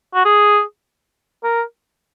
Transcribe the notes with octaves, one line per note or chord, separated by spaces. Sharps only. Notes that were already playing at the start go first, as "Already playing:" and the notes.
F#4
G#4
A#4